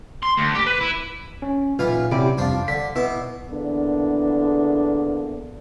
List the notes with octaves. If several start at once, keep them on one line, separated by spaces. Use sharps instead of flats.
C6
D2
G4
B4
E4
C#4
B1 A#2 E3 F4 B4
F#2 C3 E4 G4 D5
C2 F2 F3 D4 F5
D3 B6
B2 B3 E4 D6
E2 D3 A#3 B3 D4